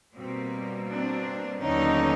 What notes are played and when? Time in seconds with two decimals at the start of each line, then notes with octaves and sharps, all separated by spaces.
0.14 B2 G3 A#3 C4
0.87 C4 D4
1.61 D#2 D3 F#3 B3 C#4 D#4